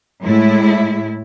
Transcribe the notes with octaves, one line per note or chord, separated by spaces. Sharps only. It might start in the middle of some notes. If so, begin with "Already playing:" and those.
A2 G#3 E4